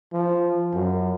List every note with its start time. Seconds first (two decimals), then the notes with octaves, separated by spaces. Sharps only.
0.13 F3
0.74 F#2